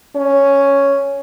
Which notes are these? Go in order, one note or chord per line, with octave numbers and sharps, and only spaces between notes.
C#4